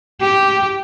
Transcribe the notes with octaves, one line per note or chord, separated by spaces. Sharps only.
G4